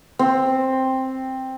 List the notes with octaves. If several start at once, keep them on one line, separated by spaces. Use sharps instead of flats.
C4